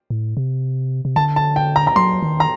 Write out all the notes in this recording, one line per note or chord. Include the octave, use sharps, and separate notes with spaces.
A2
C3
C3
D3 A5
A5
G5
A#5
A#5
F#3 C6
D#3
A#5